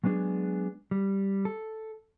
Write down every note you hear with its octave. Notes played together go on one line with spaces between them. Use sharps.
F#3 G#3 B3 D4 G#4
G3
A4